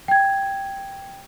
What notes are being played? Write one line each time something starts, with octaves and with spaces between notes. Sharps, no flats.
G5 G#6